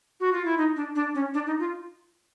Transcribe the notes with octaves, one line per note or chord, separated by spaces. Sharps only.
F#4
F4
E4
D#4
D4
D4
C#4
D4
D#4
F4